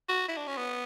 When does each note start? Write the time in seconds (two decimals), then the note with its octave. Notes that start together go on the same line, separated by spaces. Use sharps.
0.09 F#4
0.28 E4
0.37 D4
0.47 C#4
0.57 B3